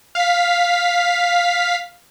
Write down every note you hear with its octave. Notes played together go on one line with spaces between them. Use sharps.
F5 B6